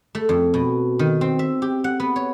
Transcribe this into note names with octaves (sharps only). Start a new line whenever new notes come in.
A3
F2
B2
D#3
C4
E5
G4
F#5
B3
C#5